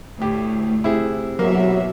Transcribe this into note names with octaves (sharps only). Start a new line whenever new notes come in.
D2 A2 G4
C3 E4 G#4
B2 E3 F#3 A#3 E5